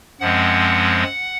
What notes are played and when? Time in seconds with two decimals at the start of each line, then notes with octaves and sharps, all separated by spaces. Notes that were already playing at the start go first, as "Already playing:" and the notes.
0.20 F#2 F3 G#3 C4 F#5